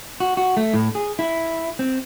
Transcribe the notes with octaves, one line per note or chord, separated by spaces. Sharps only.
F#4
F#4
A3
A2
G#4
E4
C4